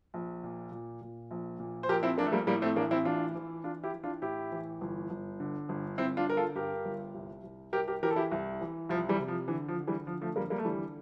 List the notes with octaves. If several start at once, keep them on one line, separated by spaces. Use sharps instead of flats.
A#1
A#2
A#2
A#2
A#1
A#2
C5
A#1 G4 A#4
C4 E4
A#1 A#3 D4
A3
G3 A#3
A2 G3 A#3
A3 C4
A1 A#3 D4
C4 E4
E3 D4 F4
E3
E3 D4 F4
E4 G4
E3
D4 F4
A2 E4 G4
E3
G1
G1
D3
G1
G1 C4 E4
D4 F4
D3 A#4
F4 A4
G2 G4 A#4
G1
C2
C2
C2 G4 A#4
G4 A#4
E3 G4 A#4
A4
E4 G4
C2
E3
C2 F3
E3 G3
C3
F3
D3 E3
F3
D3
E3 G3
D3 F3
F3 A3
F2 G3 A#3
G3 A#3
A3
D3 E3 G3